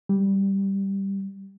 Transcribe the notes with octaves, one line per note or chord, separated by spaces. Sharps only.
G3